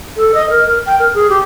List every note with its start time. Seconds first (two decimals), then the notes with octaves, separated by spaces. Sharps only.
0.17 A4
0.34 D#5
0.50 A#4
0.66 A#4
0.86 G5
0.99 A#4
1.14 G#4
1.30 G4